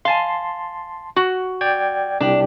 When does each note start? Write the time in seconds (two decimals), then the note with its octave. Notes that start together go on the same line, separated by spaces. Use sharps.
0.05 F5 G#5 A5 C6
1.16 F#4
1.61 D5 G5 G#6
2.20 C2 D4 G4